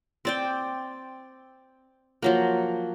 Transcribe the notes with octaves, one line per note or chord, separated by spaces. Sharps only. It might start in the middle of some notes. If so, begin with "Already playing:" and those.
C4 D5 G5
F3 F#3 A#3